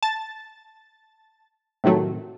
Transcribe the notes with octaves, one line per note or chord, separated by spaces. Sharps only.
A5 A6
A2 C3 D#3 F#3 A3